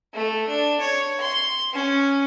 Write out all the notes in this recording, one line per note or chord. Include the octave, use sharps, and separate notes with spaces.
A3
D4
C#5
C6
C#4